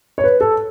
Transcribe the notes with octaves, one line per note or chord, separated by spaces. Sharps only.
C#5
B4
A4